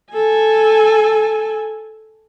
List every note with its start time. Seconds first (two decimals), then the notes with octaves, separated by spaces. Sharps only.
0.12 A4 G#5